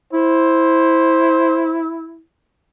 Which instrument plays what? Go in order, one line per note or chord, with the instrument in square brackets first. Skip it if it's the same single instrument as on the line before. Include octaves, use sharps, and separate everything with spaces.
[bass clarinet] E4 [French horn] C5